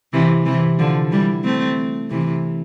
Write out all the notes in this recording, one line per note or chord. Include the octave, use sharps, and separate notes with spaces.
C3 E3
C3 E3
D3 F3
E3 G3
A3 C4
C3 E3